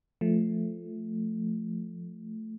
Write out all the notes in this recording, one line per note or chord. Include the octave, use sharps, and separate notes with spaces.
F3 A3